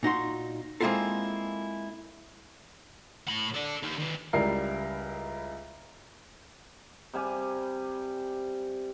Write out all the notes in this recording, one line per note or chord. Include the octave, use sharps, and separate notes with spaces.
A#2 D#4 F#4 C6
G#3 A#3 C4 E4 F4 A4
A2 B5
A4 D5
D#4 G4
D#3 B4
C#2 G3 E4 A#4 E5 C7
C3 G3 G#5